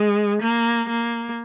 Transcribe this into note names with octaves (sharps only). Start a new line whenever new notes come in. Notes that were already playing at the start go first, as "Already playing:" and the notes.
Already playing: G#3
A#3
A#3